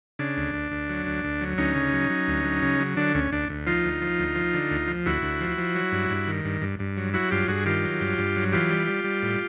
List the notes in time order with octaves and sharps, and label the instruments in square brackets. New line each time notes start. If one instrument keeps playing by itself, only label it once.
[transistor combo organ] C#3 D4
D2
D2
D2
F#3
D2
D2
F#3
D2 C#4 D#4
C#3
F#3
F#3
D2
F#3
C#3
F#3
D3 D4
D2 C#4
D2 D4
D2
F3 D#4 F4
D2
F3
D2
F3
D3
D2
F3
D2 E4 F#4
D2
F3
F3
F#3
G2
G2
D#3
G2
G2
G2
F#3
F#3 E4 F#4
G2 F4 G4
G2 F#4 G#4
D#3 F4 G4
F#3
G2
G2
F#3
E3 F4 G4
G3
G3
G3
A2